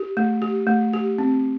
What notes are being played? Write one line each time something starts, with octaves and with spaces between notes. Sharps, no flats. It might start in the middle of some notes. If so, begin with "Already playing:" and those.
Already playing: G4
A3
G4
A3
G4
C4